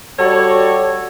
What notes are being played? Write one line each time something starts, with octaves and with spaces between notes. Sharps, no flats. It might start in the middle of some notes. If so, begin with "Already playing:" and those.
G3 F#4 A4 C#5 D5 A5